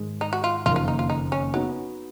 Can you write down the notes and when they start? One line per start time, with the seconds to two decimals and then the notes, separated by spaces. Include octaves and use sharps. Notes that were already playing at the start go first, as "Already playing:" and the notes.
Already playing: G#2 D#3 G#3
0.21 D#4
0.33 F#4
0.44 F4
0.66 F#1 F2 D#3 A#3 F4
0.76 F4
0.88 D#4
0.99 F4
1.10 D#4
1.32 C#4
1.54 F#3 B3 D#4 F#4